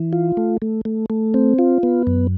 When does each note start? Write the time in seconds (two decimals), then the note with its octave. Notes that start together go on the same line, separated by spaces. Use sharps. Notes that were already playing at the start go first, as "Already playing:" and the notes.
Already playing: E3
0.13 F4
0.37 A3
0.62 A3
0.85 A3
1.10 A3
1.34 C4
1.59 F4
1.83 B3
2.07 F#2